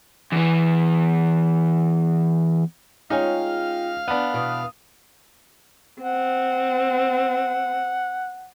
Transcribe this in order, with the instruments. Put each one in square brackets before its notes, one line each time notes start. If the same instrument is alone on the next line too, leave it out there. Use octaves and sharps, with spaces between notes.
[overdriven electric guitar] E2 E3
[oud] G#3 C#4 [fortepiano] D#4 [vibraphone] F4 G5 [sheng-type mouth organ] F5 F6
[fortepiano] B3 D4
[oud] B2 E3 [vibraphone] D#6
[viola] C4 [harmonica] F#5